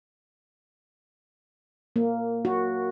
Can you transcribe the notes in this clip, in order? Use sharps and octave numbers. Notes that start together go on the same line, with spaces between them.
A#3
F#4